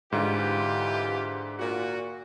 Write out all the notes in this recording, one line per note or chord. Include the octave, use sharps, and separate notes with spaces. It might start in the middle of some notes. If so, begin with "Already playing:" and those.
G#2 D3 E3 F4 G4
A#2 F#4